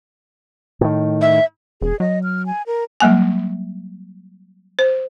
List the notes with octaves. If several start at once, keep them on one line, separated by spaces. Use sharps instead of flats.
A2 D#3
E5
E1 G#4
F#3 D#5
F6
G#5
A#4
F#3 G3 A#3 G#5
C5